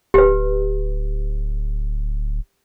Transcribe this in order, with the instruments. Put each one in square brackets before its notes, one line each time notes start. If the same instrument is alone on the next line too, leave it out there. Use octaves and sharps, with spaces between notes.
[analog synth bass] D1 [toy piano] G4 B4